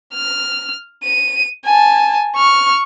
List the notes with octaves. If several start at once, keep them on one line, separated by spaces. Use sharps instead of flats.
F6
D#7
G#5 A5
C#6 F6